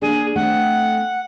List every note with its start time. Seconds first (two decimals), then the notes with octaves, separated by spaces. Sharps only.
0.02 A#3 D4 G#4
0.36 A3 C4 F#5